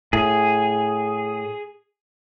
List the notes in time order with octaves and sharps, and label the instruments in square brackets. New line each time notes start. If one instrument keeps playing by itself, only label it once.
[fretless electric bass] A2 [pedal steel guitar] G#4